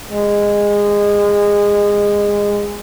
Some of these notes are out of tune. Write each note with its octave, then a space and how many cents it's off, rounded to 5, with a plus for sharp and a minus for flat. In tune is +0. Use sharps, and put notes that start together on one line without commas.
G#3 -20